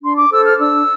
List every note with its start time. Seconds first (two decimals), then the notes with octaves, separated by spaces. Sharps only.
0.03 D4 C6
0.16 D6
0.30 A4 C5 E6
0.45 F6
0.59 D4 E6